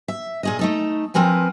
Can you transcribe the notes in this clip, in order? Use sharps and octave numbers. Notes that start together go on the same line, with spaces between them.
E5
A#2 G#4 D#5
A3 D#4 A4
F3 C4 A#4 B4 G#5